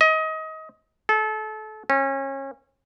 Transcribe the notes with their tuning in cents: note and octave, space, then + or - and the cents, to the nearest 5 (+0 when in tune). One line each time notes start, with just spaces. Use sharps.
D#5 +25
A4 -30
C#4 -30